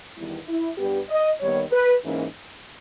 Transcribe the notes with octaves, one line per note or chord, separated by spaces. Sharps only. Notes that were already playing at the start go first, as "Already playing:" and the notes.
E2 D#3 G3 B3 E4
E4
G2 G3 B3 G4
D#5
D#2 D#3 G3 B3 C#5
B4
G#2 E3 A#3 C#4